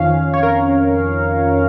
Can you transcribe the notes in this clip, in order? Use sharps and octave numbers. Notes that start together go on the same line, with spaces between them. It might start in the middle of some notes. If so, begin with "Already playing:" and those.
Already playing: F2 D#3 C#4 F5
C#5
A#4